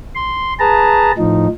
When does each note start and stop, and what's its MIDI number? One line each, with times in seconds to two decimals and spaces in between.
0.15 0.54 84
0.60 1.12 68
0.60 1.12 71
0.60 1.12 81
0.60 1.12 82
1.18 1.47 45
1.18 1.47 53
1.18 1.47 63